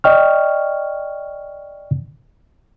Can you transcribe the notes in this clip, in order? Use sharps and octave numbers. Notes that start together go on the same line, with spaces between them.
D5 D#5 G5 C#6 F6